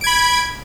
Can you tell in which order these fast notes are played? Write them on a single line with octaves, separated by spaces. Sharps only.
D7 G#6 B5